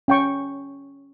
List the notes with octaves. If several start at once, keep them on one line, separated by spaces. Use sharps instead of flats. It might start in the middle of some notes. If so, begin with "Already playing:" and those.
C#4 G5 C#6